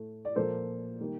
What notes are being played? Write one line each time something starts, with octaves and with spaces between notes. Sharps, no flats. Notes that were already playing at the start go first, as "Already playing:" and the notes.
Already playing: A2 A3
D5
A#2 F3 A#3 A4 C5
D#3 G3 A#3